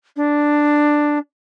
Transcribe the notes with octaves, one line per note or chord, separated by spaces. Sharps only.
D4